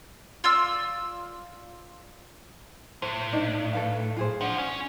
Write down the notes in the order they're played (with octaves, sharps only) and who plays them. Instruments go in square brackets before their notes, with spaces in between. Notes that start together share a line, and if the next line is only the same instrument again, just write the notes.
[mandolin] F4 D5 E6
[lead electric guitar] A2 [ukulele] C5
[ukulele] D4 D#4 D5
A4 B4 F5
F4 G#4 C5
[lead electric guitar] B1 F3 [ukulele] D4 F#5
[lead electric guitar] C#4